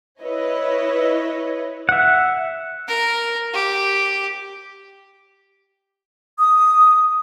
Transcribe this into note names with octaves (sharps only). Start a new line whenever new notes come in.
E4 B4 C#5 D#5
E5 F#5
A#4
G4
D#6